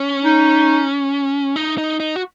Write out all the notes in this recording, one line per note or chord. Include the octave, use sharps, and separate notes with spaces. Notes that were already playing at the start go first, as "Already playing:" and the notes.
Already playing: C#4
D#4
D#4
D#4
D#4
F#4